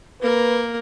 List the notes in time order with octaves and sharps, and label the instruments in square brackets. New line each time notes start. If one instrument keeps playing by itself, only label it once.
[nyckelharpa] A#3 A#4 [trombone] B4